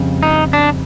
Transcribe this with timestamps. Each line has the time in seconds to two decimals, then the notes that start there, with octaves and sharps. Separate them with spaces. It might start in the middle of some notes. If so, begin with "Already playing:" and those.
Already playing: F2 C#3 G3
0.23 D#4
0.53 D4